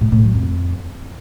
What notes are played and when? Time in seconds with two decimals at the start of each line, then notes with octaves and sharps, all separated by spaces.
0.01 A2
0.12 A2
0.23 F#3
0.34 F2